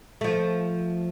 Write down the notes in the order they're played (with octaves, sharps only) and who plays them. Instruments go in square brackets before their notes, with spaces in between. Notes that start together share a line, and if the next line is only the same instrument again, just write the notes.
[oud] F3 A3